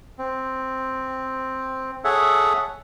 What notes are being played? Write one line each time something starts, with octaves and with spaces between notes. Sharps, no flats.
C4
G#4 A4 C#5 E5 F#5